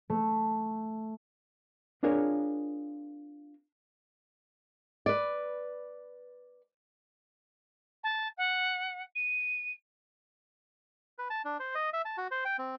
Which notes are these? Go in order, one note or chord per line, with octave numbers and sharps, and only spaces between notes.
A3
C4 D4 F4 G#4 A#4 C#5
B4 D5
A5
F#5
D#7
B4
A5
D4
C5
D#5
E5
A5
F#4
C5
G5
C4